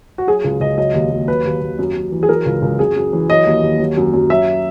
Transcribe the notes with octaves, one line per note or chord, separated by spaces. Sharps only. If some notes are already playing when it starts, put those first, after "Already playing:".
F#4
F#3 G#4
C#2
C#2 D#5
F#3 D#5
D#2
D#2
F#3 B4
D#2
D#2
F#2
F#2
E3
G#4
F#3 A#4
C#2
C#2
F#2 G#4
F#2
E3
F#3 D#5
D#2
D#2
F#3
F#2
F#2
F#3 E5